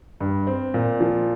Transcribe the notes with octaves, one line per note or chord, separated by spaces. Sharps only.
G2
C4
A#2
F3